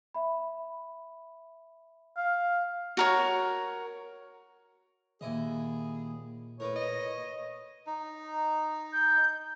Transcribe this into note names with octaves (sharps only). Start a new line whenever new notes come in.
E5 B5
F5
F#4 A#4 C#5
D#2 A#2 E4 G#4 D#5
A2 A#4 B4 C#5
D#5
D#4
G6